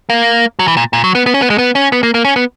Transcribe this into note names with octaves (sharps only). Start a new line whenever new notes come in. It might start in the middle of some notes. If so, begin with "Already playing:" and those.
A#3
F#3
E3
A#2
A#2
F#3
B3
B3
C#4
B3
G#3
B3
C#4
B3
A#3
A#3
C#4
B3